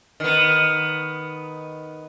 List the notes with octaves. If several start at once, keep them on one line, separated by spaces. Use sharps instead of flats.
D#3 B3